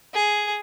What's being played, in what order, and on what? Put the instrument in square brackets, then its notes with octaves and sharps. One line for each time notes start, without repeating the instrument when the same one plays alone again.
[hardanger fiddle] G#4